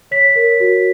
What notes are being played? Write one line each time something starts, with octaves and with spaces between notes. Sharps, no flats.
C#5 B6
A#4
F#4